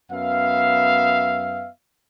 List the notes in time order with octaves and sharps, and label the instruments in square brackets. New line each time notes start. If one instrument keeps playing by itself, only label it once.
[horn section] F#2 B3 E5 F5